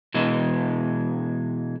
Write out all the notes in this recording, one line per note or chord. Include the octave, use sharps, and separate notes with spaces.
B2 E3 G#3